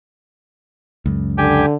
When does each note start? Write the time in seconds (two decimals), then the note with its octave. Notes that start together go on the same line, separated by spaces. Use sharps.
1.06 C#2 F#2
1.38 D3 G4 G5 G#5